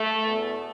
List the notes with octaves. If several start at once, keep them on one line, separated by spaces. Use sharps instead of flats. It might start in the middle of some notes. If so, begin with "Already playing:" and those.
Already playing: A3
E2 B2